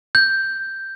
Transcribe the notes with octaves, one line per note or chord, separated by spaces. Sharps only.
G6